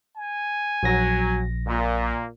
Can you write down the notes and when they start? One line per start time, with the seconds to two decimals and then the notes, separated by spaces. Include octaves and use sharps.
0.16 G#5
0.83 A#1 F#3 A#6
1.66 A#2 G#3
2.01 A#3